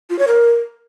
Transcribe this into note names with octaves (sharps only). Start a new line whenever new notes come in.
F4
C#5
A#4